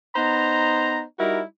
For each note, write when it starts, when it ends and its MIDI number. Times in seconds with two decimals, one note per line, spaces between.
0.16 1.03 59
0.16 1.03 63
0.16 1.03 72
0.16 1.03 82
1.19 1.41 55
1.19 1.41 63
1.19 1.41 64
1.19 1.41 66
1.19 1.41 70